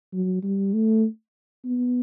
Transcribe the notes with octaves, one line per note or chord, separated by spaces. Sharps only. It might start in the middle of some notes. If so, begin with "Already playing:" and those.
F#3
G3
A3
B3